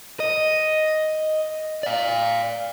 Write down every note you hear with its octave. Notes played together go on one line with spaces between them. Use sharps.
D#5
D5 F5